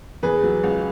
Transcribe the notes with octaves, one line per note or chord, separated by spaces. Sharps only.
E2 G#4 B4
F#3
C#2